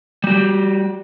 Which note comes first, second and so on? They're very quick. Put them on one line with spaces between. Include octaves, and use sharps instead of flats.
G3 F#4 G4